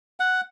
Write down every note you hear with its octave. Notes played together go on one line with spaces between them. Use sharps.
F#5